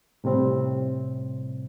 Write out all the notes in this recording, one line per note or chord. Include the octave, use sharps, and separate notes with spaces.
A2 C3 G3 C4